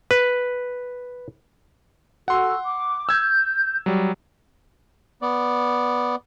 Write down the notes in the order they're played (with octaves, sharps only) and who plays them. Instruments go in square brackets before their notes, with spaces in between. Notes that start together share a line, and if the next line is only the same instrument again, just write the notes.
[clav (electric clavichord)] B4
[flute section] F#4 A4 E6 [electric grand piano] F#5 C6
[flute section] D6
[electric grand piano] E6 G#6 [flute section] G6
[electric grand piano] F#3 G3
[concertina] B3 D5